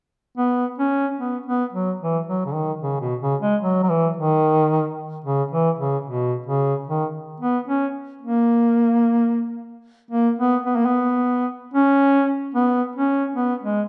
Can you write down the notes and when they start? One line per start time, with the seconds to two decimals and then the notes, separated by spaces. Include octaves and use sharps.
0.38 B3
0.78 C#4
1.19 B3
1.46 B3
1.73 F#3
2.00 E3
2.27 F#3
2.45 C#3
2.53 D#3
2.82 C#3
3.01 B2
3.22 C#3
3.42 G#3
3.62 F#3
3.83 F#3
3.90 E3
4.17 D#3
5.25 C#3
5.51 E3
5.79 C#3
6.06 B2
6.46 C#3
6.87 D#3
7.40 B3
7.68 C#4
8.21 A#3
10.11 A#3
10.39 B3
10.66 B3
10.76 A#3
10.86 B3
11.74 C#4
12.55 B3
12.96 C#4
13.36 B3
13.63 G#3